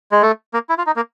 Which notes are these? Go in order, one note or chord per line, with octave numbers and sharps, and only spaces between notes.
G#3
A3
A#3
E4
F4
D#4
A#3